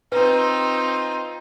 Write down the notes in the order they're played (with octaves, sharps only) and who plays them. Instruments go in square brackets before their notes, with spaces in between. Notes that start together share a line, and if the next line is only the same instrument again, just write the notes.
[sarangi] C4 [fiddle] D#4 F4 [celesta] B4